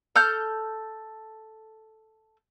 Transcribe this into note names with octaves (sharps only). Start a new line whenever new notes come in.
A4 F6 G6